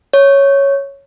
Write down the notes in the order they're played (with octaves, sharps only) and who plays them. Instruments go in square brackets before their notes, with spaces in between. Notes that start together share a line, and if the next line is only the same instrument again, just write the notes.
[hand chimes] C#5